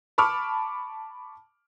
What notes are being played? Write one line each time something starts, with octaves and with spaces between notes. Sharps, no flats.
A5 B5 C#6 D6 F6